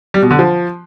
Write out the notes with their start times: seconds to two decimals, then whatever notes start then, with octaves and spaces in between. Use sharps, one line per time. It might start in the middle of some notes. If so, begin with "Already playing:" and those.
0.14 G3
0.22 B2
0.31 D3
0.39 F3